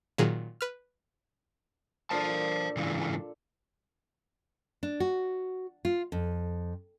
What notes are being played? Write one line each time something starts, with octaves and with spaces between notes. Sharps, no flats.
A#2 D#3 F#3 G#4
B4 F6
A#2 D4 A4 C5 A5
G#2 C#3 E3
D4
F#4
F4
F2